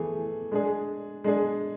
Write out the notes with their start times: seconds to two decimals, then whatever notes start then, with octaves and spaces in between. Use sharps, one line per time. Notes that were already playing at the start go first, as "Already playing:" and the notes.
Already playing: E3 A3 E4 G#4
0.52 G#3 D4 G#4
1.24 G#3 D4 G#4